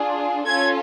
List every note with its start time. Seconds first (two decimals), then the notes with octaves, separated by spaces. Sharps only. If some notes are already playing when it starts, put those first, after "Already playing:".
Already playing: D4 F4 G#4
0.46 C#4 F4 A4 G#6